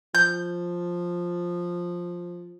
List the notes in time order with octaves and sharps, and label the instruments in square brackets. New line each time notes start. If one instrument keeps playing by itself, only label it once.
[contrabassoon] F3 [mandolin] G6